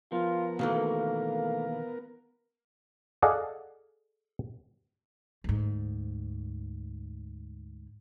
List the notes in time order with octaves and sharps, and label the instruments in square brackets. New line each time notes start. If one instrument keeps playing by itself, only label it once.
[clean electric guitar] F3 [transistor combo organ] B3 A#4 [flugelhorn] F4
[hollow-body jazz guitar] B2 D#3 E3 [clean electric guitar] A3 A#3 [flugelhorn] F5
[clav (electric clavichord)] G#4 A4 D5 D#5 F5 F#5
[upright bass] D2 G#2